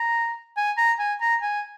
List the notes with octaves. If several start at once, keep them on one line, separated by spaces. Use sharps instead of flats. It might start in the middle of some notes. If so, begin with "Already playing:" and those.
Already playing: A#5
G#5
A#5
G#5
A#5
G#5